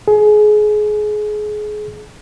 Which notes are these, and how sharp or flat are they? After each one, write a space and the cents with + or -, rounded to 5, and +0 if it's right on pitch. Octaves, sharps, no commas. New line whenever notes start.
G#4 +25